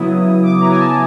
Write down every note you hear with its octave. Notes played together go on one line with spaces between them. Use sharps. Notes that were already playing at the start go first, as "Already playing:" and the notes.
Already playing: C#3 F#3 B3 E4 D#6
C#3
D6
F#3 B3 E4 A#5
G#5
A5